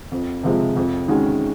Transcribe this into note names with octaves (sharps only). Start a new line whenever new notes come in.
F2
C3 F3 G#3
F2
D#3 G#3 C#4 F#4